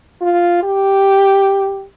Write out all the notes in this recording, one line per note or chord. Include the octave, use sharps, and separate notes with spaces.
F4
G4